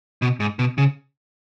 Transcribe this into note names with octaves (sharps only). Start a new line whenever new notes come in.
B2
G#2
B2
C#3